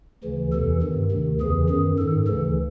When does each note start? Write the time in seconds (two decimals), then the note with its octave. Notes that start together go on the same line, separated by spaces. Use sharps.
0.24 D2 C#3 E3
0.53 E2 C3 E3 A4
0.82 G2 D#3
1.11 D2 C3 D#3
1.40 E2 C#3 E3 G#4
1.69 F#2 D#3 G#4
1.99 G#2 D#3 A4
2.27 D2 C#3 E3 A4